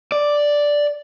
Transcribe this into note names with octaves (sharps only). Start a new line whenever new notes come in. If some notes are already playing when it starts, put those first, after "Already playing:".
D5